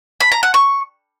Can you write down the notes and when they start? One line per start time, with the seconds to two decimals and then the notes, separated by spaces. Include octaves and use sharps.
0.20 B5
0.32 A#5
0.43 F#5
0.54 C#6